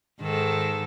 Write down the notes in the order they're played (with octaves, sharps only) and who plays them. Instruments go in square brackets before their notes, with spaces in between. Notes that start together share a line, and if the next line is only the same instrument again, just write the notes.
[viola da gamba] G#2 D#3 A4